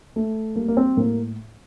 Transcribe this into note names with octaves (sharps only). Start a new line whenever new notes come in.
A3
G3 A#3
A#3
C4
A2 A#3